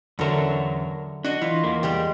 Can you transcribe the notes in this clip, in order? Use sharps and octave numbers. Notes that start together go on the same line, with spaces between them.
E2 D3 F#3 A#4 E5
D4 F#4 D#5
E3 F4
E2 A#3
G3 G#3 G4